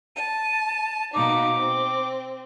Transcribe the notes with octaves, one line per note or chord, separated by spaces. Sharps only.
A5 D#7
B2 A#3 D#4 D6
C4